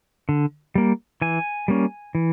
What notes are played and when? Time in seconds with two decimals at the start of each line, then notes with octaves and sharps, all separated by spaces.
0.29 D3
0.75 G3 A#3
1.22 E3 G#5
1.68 G3 A#3 C#4
2.15 E3